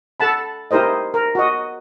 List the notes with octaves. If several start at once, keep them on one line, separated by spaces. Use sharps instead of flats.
A4 F#5 A5 B5
D#4 E4 G4 A#4 C5 D#5
A#4
F#4 D#5